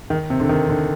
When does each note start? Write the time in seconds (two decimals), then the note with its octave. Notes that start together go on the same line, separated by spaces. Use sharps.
0.10 D#3
0.30 C3
0.40 D3
0.49 D#3
0.69 D3